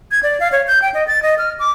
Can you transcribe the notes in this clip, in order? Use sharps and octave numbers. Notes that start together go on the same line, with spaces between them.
G#6
D5
F5
C#5
G6
G5
D#5
A6
D#5
F6
D6